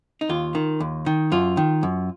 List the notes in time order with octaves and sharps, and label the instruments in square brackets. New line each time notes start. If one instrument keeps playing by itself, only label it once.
[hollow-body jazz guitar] D#4
D#2 F4
D#3
D#2
D#3
F#2 F4
D#3
F#2